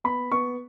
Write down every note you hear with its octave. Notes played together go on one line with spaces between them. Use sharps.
B3 B5
B3 C#6